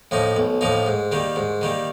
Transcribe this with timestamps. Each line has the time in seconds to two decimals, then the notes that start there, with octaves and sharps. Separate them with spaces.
0.11 A2 F3 A#3 D#4
0.37 B1
0.61 A2 F3 A#3 D#4
0.86 G#2
1.12 D#3 G3 A#3
1.36 G#2
1.61 D#3 G3 A#3